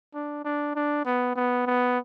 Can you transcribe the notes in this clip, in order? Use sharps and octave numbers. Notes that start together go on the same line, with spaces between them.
D4
D4
D4
B3
B3
B3